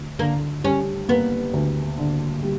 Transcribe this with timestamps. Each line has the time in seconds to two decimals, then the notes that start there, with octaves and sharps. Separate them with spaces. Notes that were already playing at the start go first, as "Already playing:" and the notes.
Already playing: D2
0.19 D3 A#3
0.64 G3 C#4
1.09 A#3 B3
1.53 D2
1.98 D3
2.43 G3